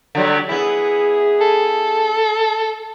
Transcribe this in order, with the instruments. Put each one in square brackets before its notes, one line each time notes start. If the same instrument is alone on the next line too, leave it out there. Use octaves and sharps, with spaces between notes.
[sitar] D3 F#3 G3
[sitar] B3 E4 [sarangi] G#4
[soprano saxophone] A4